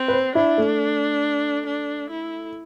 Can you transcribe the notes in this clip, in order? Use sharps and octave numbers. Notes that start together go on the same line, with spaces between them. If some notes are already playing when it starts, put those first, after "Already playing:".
Already playing: C4
B4
C5
D4 E4
A3
D4
E4